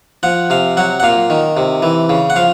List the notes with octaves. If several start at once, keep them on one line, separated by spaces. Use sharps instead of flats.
F3 F#5
C3 F5
F#3 F#5
F#5
A#2 F5
D#3
C3
E3
C#3
F#5
F3 F5